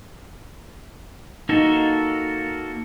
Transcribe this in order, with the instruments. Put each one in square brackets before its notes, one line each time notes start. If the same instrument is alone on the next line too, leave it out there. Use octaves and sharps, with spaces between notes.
[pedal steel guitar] A#3 F#4 A4 [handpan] D#4